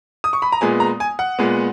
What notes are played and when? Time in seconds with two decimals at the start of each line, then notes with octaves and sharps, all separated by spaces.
0.24 D#6
0.33 C#6
0.42 B5
0.52 A#5
0.61 A#2 G#3 B3 G#5
0.80 A#5
1.00 G#5
1.19 F#5
1.39 A#2 G#3 B3